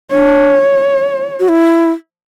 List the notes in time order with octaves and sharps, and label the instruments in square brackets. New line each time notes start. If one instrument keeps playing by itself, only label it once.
[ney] D4 [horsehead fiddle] C#5
[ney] F#4
E4